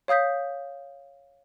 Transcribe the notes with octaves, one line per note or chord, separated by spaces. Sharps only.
C#5 F5 D#6 G6 B6